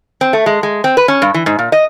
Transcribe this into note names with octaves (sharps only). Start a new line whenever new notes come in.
C4
A3
G#3
G#3
C4
B4
C#4
G2
E3
G#2
A#2
D#5